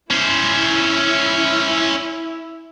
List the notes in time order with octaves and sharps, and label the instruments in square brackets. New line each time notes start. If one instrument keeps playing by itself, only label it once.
[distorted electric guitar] C#4 C5 [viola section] E4